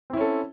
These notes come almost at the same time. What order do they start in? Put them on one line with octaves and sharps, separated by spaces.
C4 E4 C#4 A4